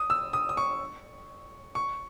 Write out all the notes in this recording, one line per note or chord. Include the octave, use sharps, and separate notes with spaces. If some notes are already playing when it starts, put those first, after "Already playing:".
Already playing: D#6
E6
D#6
D#6
C#6
C#6